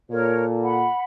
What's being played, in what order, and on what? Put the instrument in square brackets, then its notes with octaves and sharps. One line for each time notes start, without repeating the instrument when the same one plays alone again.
[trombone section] A#2 A4 [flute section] A#4 C#5
[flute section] F#5 B5